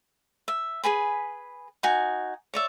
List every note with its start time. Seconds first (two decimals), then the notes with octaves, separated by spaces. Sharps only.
0.48 E5
0.84 G#4 B4 G#5 B5
1.83 D#4 F#4 G#5
2.54 C#5 D5 E5